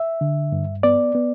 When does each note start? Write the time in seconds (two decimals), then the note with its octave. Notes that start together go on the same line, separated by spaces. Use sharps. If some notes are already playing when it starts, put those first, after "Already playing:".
Already playing: E5
0.21 D3
0.52 G2
0.83 B3 D5
1.15 B3